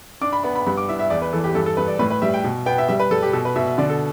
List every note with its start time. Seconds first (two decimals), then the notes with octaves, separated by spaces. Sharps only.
0.21 D4 D6
0.33 B5
0.43 B3 B5
0.55 B5
0.66 G2 B5
0.77 D6
0.89 E4 E5
0.99 E5
1.10 E2 D5
1.22 B4
1.33 E3 A4
1.44 G4
1.55 G2 A4
1.66 A4
1.77 G2 B4
1.88 D5
1.99 A2 B4
2.10 B4
2.22 G3 E5
2.34 G5
2.44 B2
2.66 B3 G5
2.78 E5
2.88 G3 E5
3.00 B4
3.11 G3 A4
3.23 G4
3.33 B2 A4
3.45 B4
3.56 B2 E5
3.67 E5
3.78 D3 D5
3.90 A4